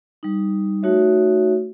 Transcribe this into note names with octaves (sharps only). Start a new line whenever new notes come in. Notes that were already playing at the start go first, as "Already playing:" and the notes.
G3 D#4
A3 D#4 F#4 C#5 E5